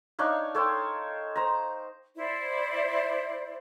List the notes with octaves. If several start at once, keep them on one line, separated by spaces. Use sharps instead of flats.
D4 D#4 C#5 F5
A4 C#5 G5 C6
C5 A#5
E4 C5 D5